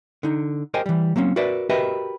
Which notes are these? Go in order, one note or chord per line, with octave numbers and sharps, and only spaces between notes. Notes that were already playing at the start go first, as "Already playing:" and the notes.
D3 D#4
G4 A#4 C5 D#5 G5 G#5
E3 G3
F#3 A#3 C4 C#4
F#4 A#4 B4 D5 E5
F#4 G4 A#4 B4 D#5 E5